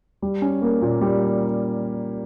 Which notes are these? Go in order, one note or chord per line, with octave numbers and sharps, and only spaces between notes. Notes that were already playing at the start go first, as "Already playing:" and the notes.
G3
C#4
A#3
A#2
G3